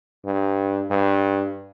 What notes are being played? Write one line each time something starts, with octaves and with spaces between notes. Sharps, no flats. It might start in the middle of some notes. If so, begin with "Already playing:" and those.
G2
G2